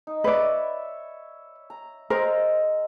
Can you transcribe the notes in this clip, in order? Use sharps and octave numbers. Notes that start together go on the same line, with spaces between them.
D#4
B4 C#5 D5 E5 B5
A#5
G#3 A#4 C5 A#5 E6